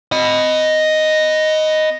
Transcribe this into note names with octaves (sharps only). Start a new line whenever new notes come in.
D#5 B5